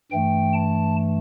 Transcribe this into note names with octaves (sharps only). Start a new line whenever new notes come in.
G2 E3 A3 G5
A5